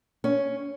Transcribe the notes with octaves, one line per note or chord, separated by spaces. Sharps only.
C#4